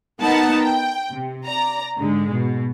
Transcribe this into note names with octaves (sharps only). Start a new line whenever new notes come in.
B3 D#4 A#4 B4 F#5 A5
G5
C3
D5 A#5
G#2 D3 G#3
B2